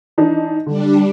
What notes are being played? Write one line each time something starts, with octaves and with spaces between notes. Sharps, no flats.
E3 D4 D#4
D3 G3 D4